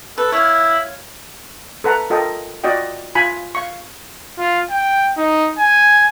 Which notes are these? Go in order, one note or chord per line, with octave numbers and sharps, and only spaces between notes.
A4 B4
E4 C#5 F5
A4 B4 F#5 A#5
F4 A4 A#4 D#5 G5
F4 F#4 D5 D#5 G5
F4 G#5 B5
F5 C#6
F4
G5
D#4
G#5